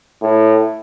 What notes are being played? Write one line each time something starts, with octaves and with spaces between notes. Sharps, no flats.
A2